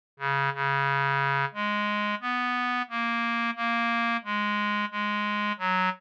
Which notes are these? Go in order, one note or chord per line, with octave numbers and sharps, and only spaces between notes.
C#3
C#3
G#3
B3
A#3
A#3
G#3
G#3
F#3